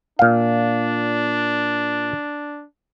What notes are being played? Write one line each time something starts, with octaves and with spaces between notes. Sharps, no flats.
A#2 D4 F5